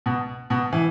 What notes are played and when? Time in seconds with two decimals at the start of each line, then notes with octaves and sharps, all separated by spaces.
0.06 B2
0.50 B2
0.73 E3